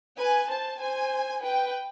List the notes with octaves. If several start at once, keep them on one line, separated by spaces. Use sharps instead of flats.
B4 G#5
C5 A5
C5 G#5
B4 G5